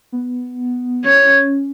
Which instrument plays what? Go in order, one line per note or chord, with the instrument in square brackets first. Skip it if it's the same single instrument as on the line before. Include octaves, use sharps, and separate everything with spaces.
[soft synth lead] B3
[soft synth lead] C#4 [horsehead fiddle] C#5